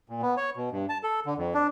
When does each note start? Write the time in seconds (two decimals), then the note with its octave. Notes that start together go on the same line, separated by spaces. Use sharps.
0.10 A#2
0.22 B3
0.37 C#5
0.57 B2
0.72 G2
0.89 A5
1.03 A4
1.26 D3
1.37 F2
1.54 D4